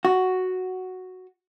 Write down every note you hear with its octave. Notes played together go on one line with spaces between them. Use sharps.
F#4